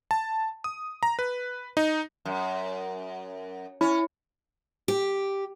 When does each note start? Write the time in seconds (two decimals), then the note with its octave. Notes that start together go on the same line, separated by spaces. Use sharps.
0.11 A5
0.64 D#6
1.03 A#5
1.19 B4
1.77 D#4
2.25 F#2
3.81 C#4 E4
4.88 G4